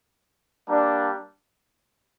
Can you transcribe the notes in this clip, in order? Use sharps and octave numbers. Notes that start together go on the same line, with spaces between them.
G3 A#3 D4